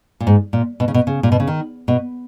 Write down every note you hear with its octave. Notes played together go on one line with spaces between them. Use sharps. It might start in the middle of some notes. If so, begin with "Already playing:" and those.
A#2
G#2
A#2
B2
C#3
B2
C#3
A#2
B2
C#3
D#3
B2